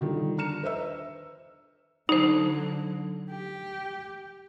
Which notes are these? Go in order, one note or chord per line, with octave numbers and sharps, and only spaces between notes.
D3 D#3 F3 G3
D4 A#5 F6 C#7 E7
B4 C5 D#5 E5 E6
D3 F#3 D#4 C5
G4